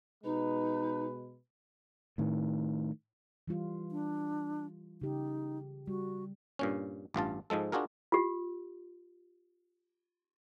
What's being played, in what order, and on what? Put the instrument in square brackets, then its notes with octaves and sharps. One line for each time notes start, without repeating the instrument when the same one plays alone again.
[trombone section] B2 G#3 B4 [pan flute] D#4
[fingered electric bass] A2 D#3
[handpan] E3 G3 F4
[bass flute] D4
[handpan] C#3 G4 [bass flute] D#4
[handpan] G3 [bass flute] F#4
[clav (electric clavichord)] G2 A#2 C#4
A1 G2 F4 A5
G#2 F3 G#3 A4
D4 F4 F#4 G#4 A#4
[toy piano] F4 G4